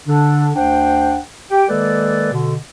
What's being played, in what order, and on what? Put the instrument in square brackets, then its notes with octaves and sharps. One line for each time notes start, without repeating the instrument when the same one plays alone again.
[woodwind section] D3 D4
D2 D4 C5 F#5 G5
G4 G5
D#3 G#3 A#3 A4 B4 D5
B2 D3